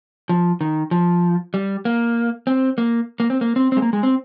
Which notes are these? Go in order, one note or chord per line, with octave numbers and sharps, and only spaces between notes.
F3
D#3
F3
G3
A#3
C4
A#3
A#3
C4
A#3
C4
C4
G#3
A#3
G#3
C4